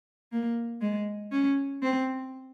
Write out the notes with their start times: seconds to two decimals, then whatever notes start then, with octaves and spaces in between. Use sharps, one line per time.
0.32 A#3
0.81 G#3
1.32 C#4
1.82 C4